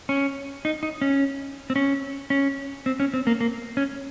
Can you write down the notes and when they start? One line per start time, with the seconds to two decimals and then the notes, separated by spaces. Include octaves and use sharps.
0.09 C#4
0.65 D#4
0.83 D#4
1.02 C#4
1.70 C4
1.76 C#4
2.30 C#4
2.86 C4
3.00 C#4
3.14 C4
3.27 A#3
3.41 A#3
3.77 C#4